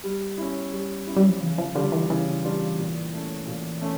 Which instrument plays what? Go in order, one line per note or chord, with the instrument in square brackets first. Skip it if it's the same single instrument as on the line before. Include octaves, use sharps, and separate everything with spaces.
[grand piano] G3
C#4 E4
G3
C#4 E4
[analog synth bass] G3
F3
[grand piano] C#3 [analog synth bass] E3
[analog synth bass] F3
[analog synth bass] D3 [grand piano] G3 D4 F4
[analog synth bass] E3
[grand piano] C#3 [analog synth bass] E3
[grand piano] G3 D4 F4
A#2
A3 C#4
A#2
A3 C#4